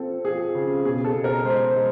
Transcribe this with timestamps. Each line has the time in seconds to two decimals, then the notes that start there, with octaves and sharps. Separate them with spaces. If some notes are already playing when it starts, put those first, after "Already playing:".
Already playing: F3 C4 A4
0.25 F3 G#4
0.55 C#3
0.84 B2 G#4
1.05 A4
1.14 B2
1.24 A#4
1.45 G#3 C5
1.65 C5
1.74 G#3